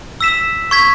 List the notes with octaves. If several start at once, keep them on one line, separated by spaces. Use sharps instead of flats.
E6 B6 E7
C#6 G#6 B6